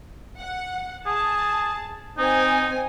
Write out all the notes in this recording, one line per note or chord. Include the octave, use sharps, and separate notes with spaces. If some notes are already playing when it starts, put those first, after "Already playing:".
F#5
G#4 A5
C4 D#4 G#5